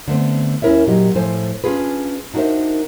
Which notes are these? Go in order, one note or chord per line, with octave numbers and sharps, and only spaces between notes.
D3 A3 B3 C4
D#2 C#4 E4 A#4 C#5 E5
A#2 F#3 G4 D#5
A2 F3 A4 C5 G#5
C#4 D4 F4 G#4 B4
D4 D#4 F#4 A#4 C5 E5